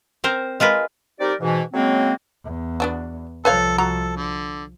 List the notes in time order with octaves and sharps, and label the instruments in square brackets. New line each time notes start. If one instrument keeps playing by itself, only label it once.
[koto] C4 A#4 C5
G#3 F4 A#4 B4
[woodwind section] G3 C4 D#4 G4 A#4 D5
G#2 B2 E3
C#3 F#3 G#3 A#3 C4
[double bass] E2
[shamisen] B3 D4 F#4
[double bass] C2 F3 [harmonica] A4 [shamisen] B4 C#5 F5
[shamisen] F#4 A#5 [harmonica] A4
[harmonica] D3